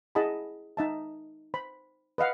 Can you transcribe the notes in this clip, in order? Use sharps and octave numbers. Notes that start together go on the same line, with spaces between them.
E4 G#4 D#5 F#5 A5 B5
D#4 E5 A5
C5 B5
B4 D#5 F5 F#5